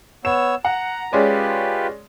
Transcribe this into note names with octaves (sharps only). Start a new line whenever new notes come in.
B3 C#5 E6 E7
F#5 A#5
G#3 C#4 F4 G4 B4 D5